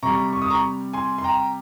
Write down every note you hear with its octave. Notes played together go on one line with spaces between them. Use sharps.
C3 G3 A#5 C#6
C#6
D#6
A#5 C#6
G#5 C6
C6
G5 A#5